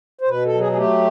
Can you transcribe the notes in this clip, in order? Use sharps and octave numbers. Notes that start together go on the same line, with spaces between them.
C5
B2 B4
A4
F#3
G#4
G#4
A3 G4